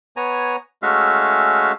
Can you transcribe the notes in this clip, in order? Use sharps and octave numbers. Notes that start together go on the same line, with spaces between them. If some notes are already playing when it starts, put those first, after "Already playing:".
B3 C#5 G#5 A#5
G#3 A3 C#4 F#4 E5 F5